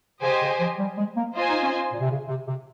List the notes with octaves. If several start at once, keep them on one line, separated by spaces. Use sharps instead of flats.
C#3 G4 C5 D#5 G#5
C#3
F3
G3
G#3
A#3
F4 C5 D#5 G#5
D#4
C#4
A#2
C3
C#3
C3
C3